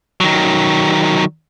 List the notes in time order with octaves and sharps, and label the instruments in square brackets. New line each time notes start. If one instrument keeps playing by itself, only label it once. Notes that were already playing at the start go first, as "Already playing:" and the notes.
[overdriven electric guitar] D#3 F#3